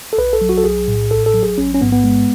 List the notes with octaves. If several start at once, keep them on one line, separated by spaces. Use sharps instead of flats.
A4
B1 B4
A4
F#3
F#4
A4
B1 G#4
A2
A1 A4
A4
F#3
G#4
A1 C#4
C#4
G#2 B3
B3
G#3